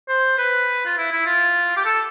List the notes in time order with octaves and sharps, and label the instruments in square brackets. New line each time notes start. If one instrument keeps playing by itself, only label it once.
[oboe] C5
B4
F4
E4
E4
F4
G4
A4